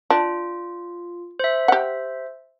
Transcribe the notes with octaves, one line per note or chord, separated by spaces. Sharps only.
D4 F4
C5 E5
G4 F#5